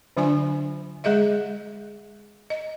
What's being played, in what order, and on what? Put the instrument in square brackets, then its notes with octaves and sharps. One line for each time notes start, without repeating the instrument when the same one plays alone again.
[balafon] D3 F#3 D4 F4 D5 G#5
G#3 G#4 D#5 E5
D#5